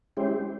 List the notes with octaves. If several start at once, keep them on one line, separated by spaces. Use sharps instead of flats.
G#3 C#4 E4 G4 C5